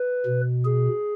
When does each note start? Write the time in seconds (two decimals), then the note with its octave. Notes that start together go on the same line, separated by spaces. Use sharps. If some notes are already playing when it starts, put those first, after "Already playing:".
Already playing: B4
0.26 B2
0.65 G#4